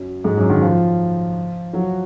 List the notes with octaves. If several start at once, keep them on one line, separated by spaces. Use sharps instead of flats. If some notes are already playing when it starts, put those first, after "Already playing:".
Already playing: F#2 F#3
G#2 G#3
F#2 F#3
D#3 D#4
F3 F4
F#3 F#4